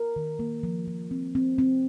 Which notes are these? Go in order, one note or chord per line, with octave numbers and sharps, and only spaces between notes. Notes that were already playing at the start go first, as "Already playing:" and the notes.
Already playing: A#4
D#3
A#3
F3
F3
C4
C4
C4